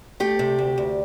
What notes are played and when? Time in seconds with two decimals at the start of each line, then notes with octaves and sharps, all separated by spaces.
0.20 A3 G4
0.39 C3
0.59 D2
0.78 D2